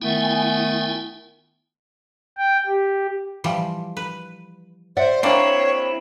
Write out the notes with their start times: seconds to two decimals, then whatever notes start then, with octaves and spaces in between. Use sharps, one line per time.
0.02 D#3 A3 B3 E4 G5 G#5
2.37 G5
2.67 G4
3.44 E3 F3 G3
3.97 B4
4.97 C5 D5 E5 F#5
5.23 A#3 C4 D4 E4 C#5